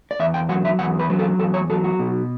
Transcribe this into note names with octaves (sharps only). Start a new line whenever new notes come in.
D5
E2 E5
G5
F#3 F#5
E5
E2 F#5
B4
F#3
A4
E2 A4
C#5
F#3 A4
F#4
B2